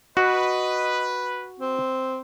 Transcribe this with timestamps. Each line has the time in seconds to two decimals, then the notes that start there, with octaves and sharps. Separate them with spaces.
0.17 F#4 B4 D#5
1.60 C4